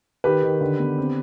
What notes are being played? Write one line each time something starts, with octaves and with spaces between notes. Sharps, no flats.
D#3 G4 B4
D#3
D3
B3
C4